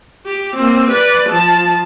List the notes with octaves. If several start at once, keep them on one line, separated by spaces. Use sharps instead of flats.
G4
A#3 C4
B4 D5
F3 A5